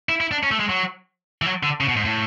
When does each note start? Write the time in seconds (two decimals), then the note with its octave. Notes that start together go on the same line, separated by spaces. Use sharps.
0.09 E4
0.21 E4
0.31 D4
0.43 C#4
0.51 A3
0.60 G#3
0.69 F#3
1.42 E3
1.46 F#3
1.63 D3
1.80 C#3
1.88 B2
1.96 G#2
2.05 A2